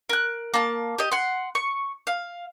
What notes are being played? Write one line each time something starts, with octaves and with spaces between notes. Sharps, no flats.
A#4 F#6
A#3 A5
G4 D#5
F#5 C6
C#6
F5